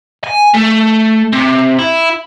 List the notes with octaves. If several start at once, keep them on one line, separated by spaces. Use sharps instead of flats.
G#5
A3
C3
E4